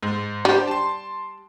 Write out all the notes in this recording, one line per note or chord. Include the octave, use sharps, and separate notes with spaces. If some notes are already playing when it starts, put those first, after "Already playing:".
G#2
G3 D4 G4 C5
A5 C6